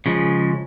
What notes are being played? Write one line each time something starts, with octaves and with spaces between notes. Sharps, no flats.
C#3 F3 G#3